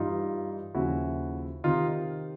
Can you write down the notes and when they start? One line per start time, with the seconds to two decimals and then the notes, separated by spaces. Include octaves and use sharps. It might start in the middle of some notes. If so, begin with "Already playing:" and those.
Already playing: G2 E3 G3 D#4 F4
0.74 D#2 C#3 F3 E4 F#4
1.64 C3 D#3 D#4 F4